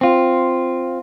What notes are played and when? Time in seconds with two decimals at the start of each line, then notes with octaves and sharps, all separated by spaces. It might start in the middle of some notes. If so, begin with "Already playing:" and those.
0.01 C4 F4